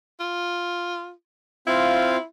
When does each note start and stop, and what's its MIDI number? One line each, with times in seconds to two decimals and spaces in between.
0.20 1.12 65
1.67 2.17 60
1.67 2.24 64
1.67 2.17 65
1.67 2.17 77